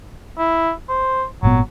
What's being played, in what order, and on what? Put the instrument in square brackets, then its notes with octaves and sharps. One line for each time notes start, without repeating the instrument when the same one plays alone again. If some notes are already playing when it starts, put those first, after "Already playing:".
[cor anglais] E4
C5
[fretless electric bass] G#1 A#2 B3 [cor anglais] F#3